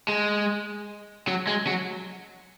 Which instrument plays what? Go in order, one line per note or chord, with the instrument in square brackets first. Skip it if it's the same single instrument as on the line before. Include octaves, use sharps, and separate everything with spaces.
[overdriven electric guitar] G#3
F#3
G#3
F#3